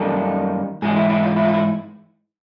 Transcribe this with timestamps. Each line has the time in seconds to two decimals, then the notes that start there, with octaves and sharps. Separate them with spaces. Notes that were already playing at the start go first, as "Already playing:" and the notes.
Already playing: F#2 D#3 G3 A#3 A4
0.82 G#2 E3 G#3 G#4
0.96 E4
1.09 E4
1.23 F4
1.36 E4
1.45 F4
1.54 E4